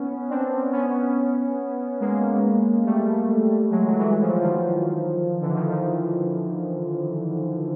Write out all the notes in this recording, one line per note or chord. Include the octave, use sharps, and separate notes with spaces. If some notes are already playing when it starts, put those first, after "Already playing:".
Already playing: B3 C#4
C4 D4
B3 C#4
G#3 A#3
G3 A3
F#3 G#3
E3 F#3
E3 F#3
F3
E3 F#3
D#3 F3
D3 E3
D#3 F3
D#3 F3